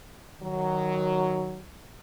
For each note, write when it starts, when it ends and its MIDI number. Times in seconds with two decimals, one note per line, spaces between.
0.41 1.60 51
0.41 1.60 54